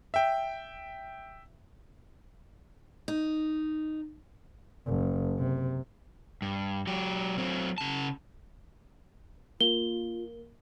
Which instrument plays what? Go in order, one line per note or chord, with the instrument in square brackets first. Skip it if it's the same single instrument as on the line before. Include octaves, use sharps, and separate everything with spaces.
[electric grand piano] E5 G5
[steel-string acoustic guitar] D#4
[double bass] F#1
C3
[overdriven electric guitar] G2
F#3 G4
F#3 C4
C#3 A5
[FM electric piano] A#3 [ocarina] F4 [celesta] G7